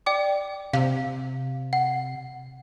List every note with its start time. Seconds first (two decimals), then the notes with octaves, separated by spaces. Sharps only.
0.06 D5 G5 D6
0.73 C3 F5
1.73 F#5